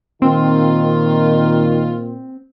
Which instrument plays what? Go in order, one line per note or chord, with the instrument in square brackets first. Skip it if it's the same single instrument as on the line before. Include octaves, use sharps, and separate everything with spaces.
[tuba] A#2 [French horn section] D#3 [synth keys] C4 [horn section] F4